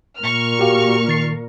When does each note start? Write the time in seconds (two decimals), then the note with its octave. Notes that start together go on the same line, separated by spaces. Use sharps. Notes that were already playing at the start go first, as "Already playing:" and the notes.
0.18 A#2 A#4 C#6 F6
0.59 F#4 G4 F5
1.08 D#3 A6 C7